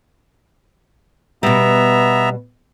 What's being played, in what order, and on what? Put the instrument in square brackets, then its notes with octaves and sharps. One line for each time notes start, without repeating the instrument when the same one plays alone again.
[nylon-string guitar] B2 G3 [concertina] B3 E5 A#5